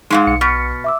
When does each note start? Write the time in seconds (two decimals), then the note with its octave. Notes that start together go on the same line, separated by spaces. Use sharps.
0.10 G#2 C#3 G#3 D#4 F5
0.27 B1 C#7
0.41 B2 F6 A6 B6
0.84 E5 D6 E6